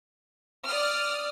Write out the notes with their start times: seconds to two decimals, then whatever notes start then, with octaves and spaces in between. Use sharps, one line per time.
0.66 D5 D#6 F6